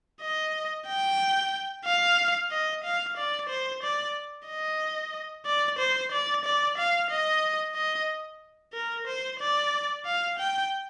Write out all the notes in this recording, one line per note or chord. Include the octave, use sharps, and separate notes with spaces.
D#5
G5
F5
D#5
F5
D5
C5
D5
D#5
D5
C5
D5
D5
F5
D#5
D#5
A#4
C5
D5
F5
G5